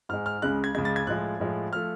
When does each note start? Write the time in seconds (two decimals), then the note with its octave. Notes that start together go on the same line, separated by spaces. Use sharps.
0.09 G#2 G#3 F6
0.26 F6
0.42 C#2 C#3 G#3 F#6
0.64 G#6
0.75 C#2 C#3 G#3 G#6
0.85 A6
0.96 G#6
1.07 A2 F3 G#3 F#6
1.40 A2 F3 G#3
1.73 F3 A3 F6